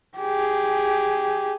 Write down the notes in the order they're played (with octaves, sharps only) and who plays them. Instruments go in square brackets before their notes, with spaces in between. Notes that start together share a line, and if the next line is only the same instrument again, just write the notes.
[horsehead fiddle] G4 G#4